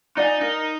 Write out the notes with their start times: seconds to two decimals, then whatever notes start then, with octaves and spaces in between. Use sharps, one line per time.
0.17 D#4 D5 F5 G#5
0.41 D#4 A#4